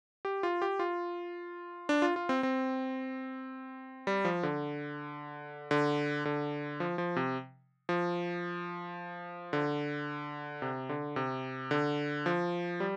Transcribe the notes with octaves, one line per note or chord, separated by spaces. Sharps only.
G4
F4
G4
F4
D4
F4
F4
C4
C4
G3
F3
D3
D3
D3
F3
F3
C3
F3
D3
C3
D3
C3
D3
F3
G3